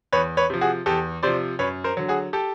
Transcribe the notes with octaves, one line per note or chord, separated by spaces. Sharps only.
E2 B4 C#5
B4 C#5
C3 F3
F#4 G#4
E2 G4 A4
C3 F3 C5 D5
F#2 B4 C#5
A#4 C5
D3 F#3
F#4 G#4
G4 A4